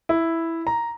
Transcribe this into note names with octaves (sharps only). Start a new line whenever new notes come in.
E4
A#5